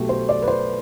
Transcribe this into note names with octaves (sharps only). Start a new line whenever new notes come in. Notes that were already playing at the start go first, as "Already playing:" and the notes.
Already playing: B1 B2 A3 G4
C5
D5
B4
C5